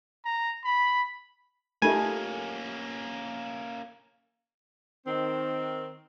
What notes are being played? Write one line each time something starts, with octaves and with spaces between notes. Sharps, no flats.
A#5
B5
A3 A#3 C#4 D#4 F4 G4 A#4 G#5
D#3 C4